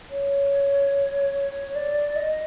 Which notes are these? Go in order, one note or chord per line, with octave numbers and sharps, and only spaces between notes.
C#5
D5
D#5